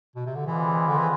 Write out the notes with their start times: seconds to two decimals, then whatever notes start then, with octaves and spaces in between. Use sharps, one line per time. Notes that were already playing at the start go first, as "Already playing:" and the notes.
0.16 B2
0.26 C3
0.35 D3
0.46 E3 G#3 C4 F4 B4 D5
0.88 D3
0.98 E3